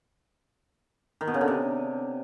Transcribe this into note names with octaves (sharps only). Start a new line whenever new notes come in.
D#3
B2
C#3
D3
C3